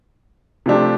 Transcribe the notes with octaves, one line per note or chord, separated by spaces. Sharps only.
C3 F3 A3 D4 G4